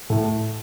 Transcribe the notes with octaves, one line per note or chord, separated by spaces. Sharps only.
A2 A3